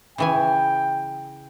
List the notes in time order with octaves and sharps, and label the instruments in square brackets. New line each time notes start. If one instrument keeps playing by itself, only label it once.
[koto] C#3 E3 G#5 [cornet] G5